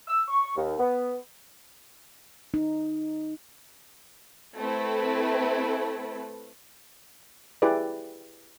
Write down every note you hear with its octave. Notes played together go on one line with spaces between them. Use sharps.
E6
C#6
D#2
B3
D#4
A3 C4 E4 A4 B4
E4 G4 G#4 B4 D5